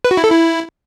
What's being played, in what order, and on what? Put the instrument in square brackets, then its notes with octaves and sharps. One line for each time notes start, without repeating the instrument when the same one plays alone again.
[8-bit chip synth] B4
F#4
E4
A4
E4